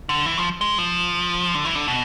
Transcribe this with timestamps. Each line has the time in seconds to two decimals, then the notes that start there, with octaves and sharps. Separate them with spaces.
0.09 D3
0.26 E3
0.37 F3
0.61 G#3
0.78 F3
1.54 D3
1.65 E3
1.75 D3
1.88 B2